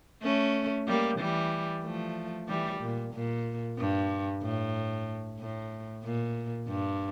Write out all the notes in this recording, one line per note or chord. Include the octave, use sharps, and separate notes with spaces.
A3 C#4
G3 A#3
E3 G3
F3 A3
E3 G3
A#2
A#2
G2
A2
A2
A#2
G2